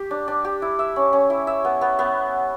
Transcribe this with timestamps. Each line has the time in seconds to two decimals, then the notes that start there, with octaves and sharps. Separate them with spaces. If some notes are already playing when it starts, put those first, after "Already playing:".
Already playing: G4
0.11 D4
0.28 D4
0.44 G4
0.62 E4
0.79 E5
0.96 C#4
1.13 C#4
1.30 E4
1.47 E5
1.65 B3
1.81 B3
1.99 B3